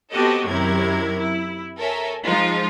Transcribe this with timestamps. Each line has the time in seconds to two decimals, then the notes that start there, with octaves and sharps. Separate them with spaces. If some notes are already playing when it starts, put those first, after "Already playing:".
0.13 B3 C4 F#4 G4 A4 D#5
0.47 F#2 C3 D#3 E4 A#4 G#6
1.19 E4
1.77 A4 A#4 C#5 E5 G#5
2.25 F3 G#3 D#4 F4